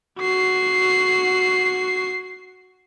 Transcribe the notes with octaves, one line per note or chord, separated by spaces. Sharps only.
F#4 C7